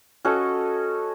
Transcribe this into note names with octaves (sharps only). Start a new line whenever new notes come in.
C#4 F#4 A4 D#5